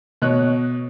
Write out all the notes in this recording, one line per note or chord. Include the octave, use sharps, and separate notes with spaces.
B2 C#5 D#5 F#6